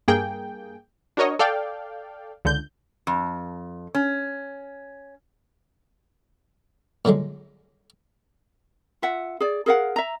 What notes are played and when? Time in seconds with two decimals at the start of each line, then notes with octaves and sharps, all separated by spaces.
0.08 G2 A#3 G#4 G5
1.17 D4 F#4 A#4 C#5 D#5
1.39 A4 D5 F5 G5
2.45 C#2 D3 G6
3.07 F2
3.95 C#4
7.05 A#2 D3 F#3 G#3
9.02 F4 E5 F#5
9.40 G#4 D5
9.66 G#4 A#4 F5 F#5
9.96 E5 A#5